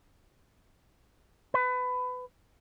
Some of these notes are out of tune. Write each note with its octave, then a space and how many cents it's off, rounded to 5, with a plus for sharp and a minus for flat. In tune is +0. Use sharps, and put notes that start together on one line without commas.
B4 +25